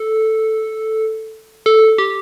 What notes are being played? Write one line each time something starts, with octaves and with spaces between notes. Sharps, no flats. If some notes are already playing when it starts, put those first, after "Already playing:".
Already playing: A4
A4
G4